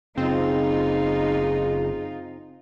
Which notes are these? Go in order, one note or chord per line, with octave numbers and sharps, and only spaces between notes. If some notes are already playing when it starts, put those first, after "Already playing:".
F#1 C4 D#4 F4 G#4